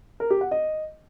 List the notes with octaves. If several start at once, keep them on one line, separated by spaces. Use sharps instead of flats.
A#4
G4
F#5
D#5